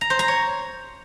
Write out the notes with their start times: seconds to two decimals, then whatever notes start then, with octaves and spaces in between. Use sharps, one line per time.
0.01 A#5
0.10 C5
0.19 A#5
0.28 C#5